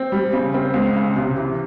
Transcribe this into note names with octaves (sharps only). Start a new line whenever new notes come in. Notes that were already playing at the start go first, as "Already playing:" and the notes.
Already playing: C4
G3
C#3
C4
C#2
C#3
C3
E3